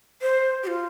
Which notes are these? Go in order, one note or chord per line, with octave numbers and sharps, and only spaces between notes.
C5
G4
F4